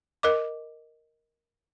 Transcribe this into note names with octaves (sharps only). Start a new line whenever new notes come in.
A#4 D#5 D6